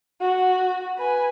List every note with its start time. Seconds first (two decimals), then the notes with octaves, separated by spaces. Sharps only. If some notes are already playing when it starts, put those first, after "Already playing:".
0.21 F#4
0.98 B4 G#5